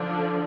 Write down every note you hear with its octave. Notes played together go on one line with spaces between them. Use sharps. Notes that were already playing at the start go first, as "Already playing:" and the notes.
Already playing: D3 F3 D4